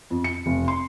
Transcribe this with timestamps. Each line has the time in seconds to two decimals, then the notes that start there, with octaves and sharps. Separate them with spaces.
0.11 F2
0.24 C#7
0.46 F1
0.68 C6